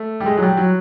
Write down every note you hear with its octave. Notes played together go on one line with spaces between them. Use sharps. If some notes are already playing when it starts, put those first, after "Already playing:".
Already playing: A3
G3
G#3
F#3
G3
F#3